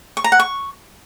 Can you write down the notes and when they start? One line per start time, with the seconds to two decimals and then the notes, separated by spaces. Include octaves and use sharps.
0.17 C#6
0.24 A#5
0.32 F#5
0.39 C#6